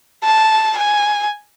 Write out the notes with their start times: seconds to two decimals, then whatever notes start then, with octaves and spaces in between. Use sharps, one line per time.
0.24 A5
0.78 G#5